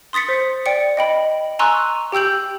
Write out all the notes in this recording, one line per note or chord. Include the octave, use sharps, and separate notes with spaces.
C6 D#6 A6 B6 C#7
C5
D5 G5 C#7
D#5 G5 B5
G#5 A#5 C6 C#6 E6 F#6
G4 G5 E6 G6 F#7